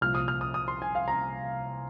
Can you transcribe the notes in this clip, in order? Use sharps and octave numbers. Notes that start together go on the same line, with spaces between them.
C2 A#2 F3 F6
D#6
F6
D#6
D#6
C6
G#5
F5
A#5